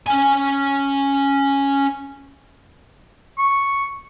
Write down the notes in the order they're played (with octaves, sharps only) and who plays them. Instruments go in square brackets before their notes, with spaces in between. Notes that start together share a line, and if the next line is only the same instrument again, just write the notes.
[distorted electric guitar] C#4 G#5
[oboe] C#6